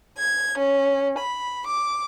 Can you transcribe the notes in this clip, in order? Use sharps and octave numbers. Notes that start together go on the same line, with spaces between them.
G#6
C#4
B5
D6